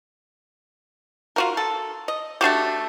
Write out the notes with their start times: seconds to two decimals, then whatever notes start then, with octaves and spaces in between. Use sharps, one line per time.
1.36 F4 F#4 A#4
1.57 A4
2.08 D#5
2.41 A3 D4 F#4 G4